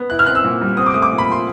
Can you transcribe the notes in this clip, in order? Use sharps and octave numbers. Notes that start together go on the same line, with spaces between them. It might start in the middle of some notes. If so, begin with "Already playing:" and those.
Already playing: B3
E4 F#6
F6
C4 F#6
E6
A#2
G3
C4 D#6
D6
A3 D#6
D6
A#2
B5
F3 C6